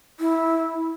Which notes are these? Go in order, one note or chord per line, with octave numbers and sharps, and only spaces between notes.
E4